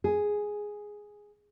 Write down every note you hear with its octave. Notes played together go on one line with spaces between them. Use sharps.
G#4